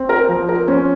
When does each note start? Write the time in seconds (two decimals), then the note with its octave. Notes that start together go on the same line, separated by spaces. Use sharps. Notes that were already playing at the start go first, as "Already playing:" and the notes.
Already playing: C4
0.09 A#4
0.28 F3
0.49 A#4
0.68 C#4 C5